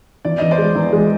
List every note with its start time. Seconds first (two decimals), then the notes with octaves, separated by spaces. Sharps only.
0.25 E2 D5
0.38 E2 D#5
0.51 C5 D5
0.58 G#3
0.75 E2
0.93 G#3